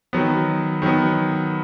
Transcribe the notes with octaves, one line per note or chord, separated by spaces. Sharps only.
D#3 F#3 B3
D#3 F#3 B3